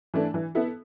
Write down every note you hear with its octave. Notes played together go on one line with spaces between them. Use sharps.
E3 A3 D4
E3
B3 E4 A4